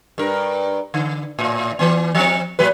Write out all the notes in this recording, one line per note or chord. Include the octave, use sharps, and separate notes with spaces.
G2 A#4
D3
A2
E3 B3
F3 C4
A2 F#3 B4